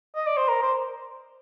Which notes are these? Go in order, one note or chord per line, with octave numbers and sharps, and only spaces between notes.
D#5
D5
C5
A#4
C5